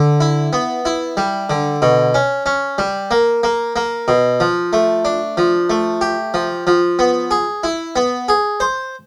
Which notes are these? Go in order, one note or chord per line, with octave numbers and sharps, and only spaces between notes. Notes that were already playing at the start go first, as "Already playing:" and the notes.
Already playing: D3
E4
B3
E4
G3
D3
B2
C#4
C#4
G3
A#3
A#3
A#3
B2
F3
A3
D4
F3
A3
G4
F3
F3
B3
G#4
E4
B3
G#4
C5